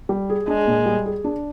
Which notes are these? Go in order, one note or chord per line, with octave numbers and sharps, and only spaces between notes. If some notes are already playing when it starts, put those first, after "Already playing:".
G3
G#4
G#3 D4
A#2
G3
G#4
D4